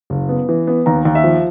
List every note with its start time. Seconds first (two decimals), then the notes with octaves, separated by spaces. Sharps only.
0.10 F#1
0.29 B3
0.49 E3
0.67 B3
0.86 D#2 A#5
1.05 D#2
1.15 E5
1.24 F3